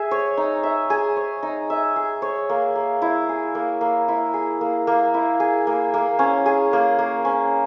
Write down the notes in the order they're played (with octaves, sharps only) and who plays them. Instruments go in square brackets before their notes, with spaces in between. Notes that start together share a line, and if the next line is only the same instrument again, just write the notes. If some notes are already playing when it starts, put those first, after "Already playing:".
Already playing: [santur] G#4 E5
C#5
D#4
E5
G#4
C#5
D#4
E5
G#4
C#5
A#3
A#3
E4
G#4
A#3
A#3
E4
G#4
A#3
A#3
E4
G#4
A#3
A#3
C#4
G#4
A#3
A#3
C#4